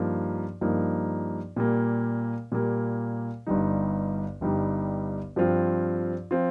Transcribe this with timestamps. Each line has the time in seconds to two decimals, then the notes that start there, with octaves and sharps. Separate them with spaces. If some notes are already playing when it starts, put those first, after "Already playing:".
Already playing: G2 F3 A#3 D#4
0.61 G2 F3 A#3 D#4
1.56 A#2 G3 A#3
2.52 A#2 G3 A#3
3.47 G1 G2 G3 D#4
4.41 G1 G2 G3 D#4
5.36 G2 F3 C4 F4
6.31 F3 C4 F4